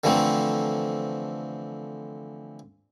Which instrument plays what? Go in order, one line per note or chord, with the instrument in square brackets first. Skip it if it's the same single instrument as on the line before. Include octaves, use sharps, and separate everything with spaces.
[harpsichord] D3 E3 F3 A3 C4